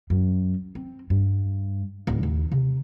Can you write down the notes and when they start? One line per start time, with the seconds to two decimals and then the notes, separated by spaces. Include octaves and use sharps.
0.10 F#2
0.75 C4
1.10 G2
2.07 D1
2.23 D#2
2.52 C3